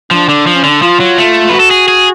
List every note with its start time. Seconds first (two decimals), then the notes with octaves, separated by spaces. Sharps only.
0.11 F3 D4
0.29 D3
0.47 F3
0.55 C#4
0.64 D3 D4
0.82 F3 F4
1.00 F#3
1.18 A3
1.49 F#4 B4
1.60 A4
1.71 G#4
1.88 G#4